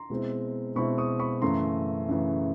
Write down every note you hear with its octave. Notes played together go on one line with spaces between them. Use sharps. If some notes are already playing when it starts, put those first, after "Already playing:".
Already playing: A#5 C6
B2 G#3 C4 E4
B2 G#3 C4 E4 B5 C#6
C#6 D#6
B5 C#6
F#2 C#3 E3 A3 A#5 C6
F#2 C#3 E3 A3